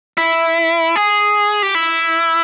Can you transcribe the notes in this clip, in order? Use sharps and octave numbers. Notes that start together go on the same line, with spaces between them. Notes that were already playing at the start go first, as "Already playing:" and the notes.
E4
G#4
G4
E4